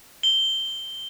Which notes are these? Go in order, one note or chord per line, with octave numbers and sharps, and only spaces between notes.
G7